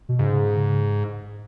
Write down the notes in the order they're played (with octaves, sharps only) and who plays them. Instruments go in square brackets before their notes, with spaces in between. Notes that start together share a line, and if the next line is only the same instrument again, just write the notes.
[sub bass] B2
[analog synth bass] G#2 [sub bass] C#3